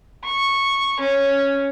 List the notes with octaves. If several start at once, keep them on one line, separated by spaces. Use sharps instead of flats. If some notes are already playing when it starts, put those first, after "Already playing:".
C#6
C#4